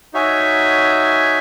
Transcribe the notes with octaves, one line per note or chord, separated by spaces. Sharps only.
D#4 F#4 C#5 E5 G#5